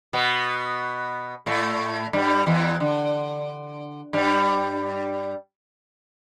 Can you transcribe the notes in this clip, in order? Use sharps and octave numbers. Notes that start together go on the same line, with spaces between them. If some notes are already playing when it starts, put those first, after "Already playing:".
B2 B3
A2 A3
G2 G3
E2 E3
D3
G2 G3